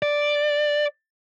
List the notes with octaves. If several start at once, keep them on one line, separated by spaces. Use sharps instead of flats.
D5